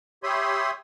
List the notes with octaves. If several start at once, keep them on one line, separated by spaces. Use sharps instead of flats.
G4 C#5 E5 B5 C6 D#6